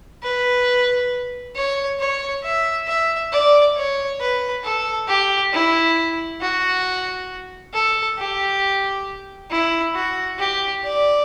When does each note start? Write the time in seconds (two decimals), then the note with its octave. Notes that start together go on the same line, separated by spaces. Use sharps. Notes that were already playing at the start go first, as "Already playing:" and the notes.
0.23 B4
1.56 C#5
2.00 C#5
2.43 E5
2.87 E5
3.32 D5
3.76 C#5
4.20 B4
4.64 A4
5.08 G4
5.53 E4
6.41 F#4
7.73 A4
8.17 G4
9.51 E4
9.95 F#4
10.39 G4
10.84 D5